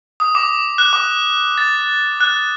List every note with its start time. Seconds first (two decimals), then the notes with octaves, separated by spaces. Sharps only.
0.20 D#6
0.35 D6
0.78 F#6
0.93 D6
1.58 A6
2.21 F#6